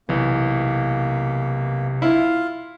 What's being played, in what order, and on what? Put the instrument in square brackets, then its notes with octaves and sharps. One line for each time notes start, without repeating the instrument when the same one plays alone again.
[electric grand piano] B1 E3 [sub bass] C3 [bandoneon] A#3
[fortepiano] E4 [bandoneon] F4 F5